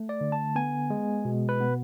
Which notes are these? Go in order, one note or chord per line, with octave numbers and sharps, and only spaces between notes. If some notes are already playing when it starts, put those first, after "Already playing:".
Already playing: A3
D5
D3
A5
B3 G#5
G#3
B2
B4
B3